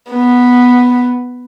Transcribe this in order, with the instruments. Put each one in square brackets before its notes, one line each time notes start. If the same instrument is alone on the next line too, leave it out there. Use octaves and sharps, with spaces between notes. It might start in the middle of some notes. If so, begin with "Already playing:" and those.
[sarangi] B3